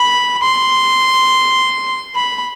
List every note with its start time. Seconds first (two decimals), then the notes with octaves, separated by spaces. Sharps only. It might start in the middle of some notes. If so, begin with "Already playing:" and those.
Already playing: B5
0.43 C6
2.15 B5